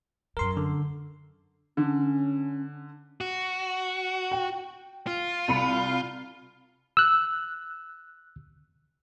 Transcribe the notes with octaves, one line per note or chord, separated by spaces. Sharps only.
F#2 G3 A#4 C6
D3
D3 C#4
F#4
G5
F4
C2 B5 C#7
E6 F#6